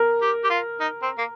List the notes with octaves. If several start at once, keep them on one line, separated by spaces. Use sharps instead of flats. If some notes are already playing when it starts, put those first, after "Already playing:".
Already playing: A#4
G4
G4
F4
D#4
C4
A#3